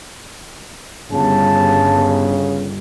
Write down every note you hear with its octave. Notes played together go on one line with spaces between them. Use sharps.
G1 C#3 A5